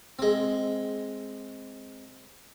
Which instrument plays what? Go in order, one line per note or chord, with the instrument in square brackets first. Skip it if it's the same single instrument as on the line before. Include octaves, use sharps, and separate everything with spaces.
[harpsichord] G#3 C4